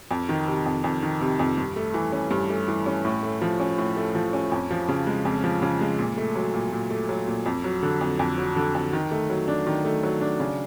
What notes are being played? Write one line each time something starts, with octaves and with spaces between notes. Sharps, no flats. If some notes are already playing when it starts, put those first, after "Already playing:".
F2
D#3
C3
F2
F2
D#3
C3
F2
G2
A3
E3
C#4
G2
A3
E3
C#4
A2
A3
F3
C#4
A2
A3
F3
C#4
F2
F3
C#3
G#3
F2
F3
C#3
G#3
A#2
A3
F#3
A#2
A#2
A3
F#3
A#2
F2
F#3
D3
F2
F2
F#3
D3
F2
D#3
A3
F#3
D4
D#3
A3
F#3
D4
C#3